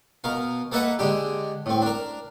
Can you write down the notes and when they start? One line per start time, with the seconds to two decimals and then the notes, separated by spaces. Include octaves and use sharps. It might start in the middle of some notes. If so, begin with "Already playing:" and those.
0.24 B2 A#4 F5
0.72 A#3 A4 B4 D#5 E5 F#5
0.99 D3 G#3 D4 G4
1.66 A2 C4
1.82 D4 A#4